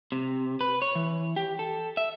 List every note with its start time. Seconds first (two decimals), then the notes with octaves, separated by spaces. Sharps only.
0.12 C3
0.61 B4
0.82 C#5
0.95 E3
1.36 G4
1.59 A4
1.97 E5